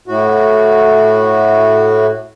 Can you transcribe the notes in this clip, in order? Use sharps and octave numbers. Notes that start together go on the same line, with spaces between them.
A2 F#4